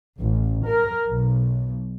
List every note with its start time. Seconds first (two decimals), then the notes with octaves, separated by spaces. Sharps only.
0.21 A1
0.66 A#4
1.10 B1